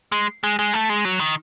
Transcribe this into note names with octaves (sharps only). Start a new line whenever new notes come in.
G#3
G#3
G#3
A3
G#3
F#3
D#3